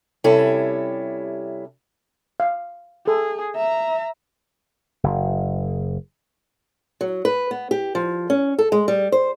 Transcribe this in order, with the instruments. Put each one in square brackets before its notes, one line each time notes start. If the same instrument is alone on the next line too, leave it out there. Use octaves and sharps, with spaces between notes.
[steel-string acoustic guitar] C3 G3 C#4 E4 A4
[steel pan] F5
[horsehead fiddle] G#4 [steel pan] A4
[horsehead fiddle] E5 A#5
[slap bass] F#1
[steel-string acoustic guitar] F#3
B4
B3
G4
F3
C#4
A4
G#3
G3
C5